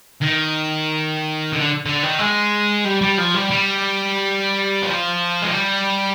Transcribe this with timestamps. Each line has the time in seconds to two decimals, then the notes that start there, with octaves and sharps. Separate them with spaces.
0.21 D#3
1.53 D3
1.86 D3
2.03 D#3
2.19 G#3
2.85 G3
3.01 G3
3.18 F3
3.34 G3
3.51 G3
4.83 F3
5.42 G#3
5.48 G3